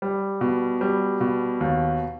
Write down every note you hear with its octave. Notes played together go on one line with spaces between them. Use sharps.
G3
B2
G3
B2
D#2